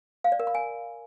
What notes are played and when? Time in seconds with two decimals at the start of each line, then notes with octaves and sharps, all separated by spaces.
0.24 F5
0.32 D5
0.40 A#4
0.47 B5
0.55 G#5